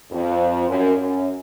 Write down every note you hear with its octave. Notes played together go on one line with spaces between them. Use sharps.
F2
F#2
F#2